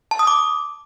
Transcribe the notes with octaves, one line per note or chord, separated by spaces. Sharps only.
A5
D#6
D6